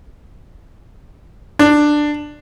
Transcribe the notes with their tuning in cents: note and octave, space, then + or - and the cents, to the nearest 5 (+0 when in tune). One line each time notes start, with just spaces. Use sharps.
D4 +10